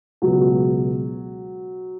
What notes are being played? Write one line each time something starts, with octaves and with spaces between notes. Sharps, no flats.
C#2 B2 F#3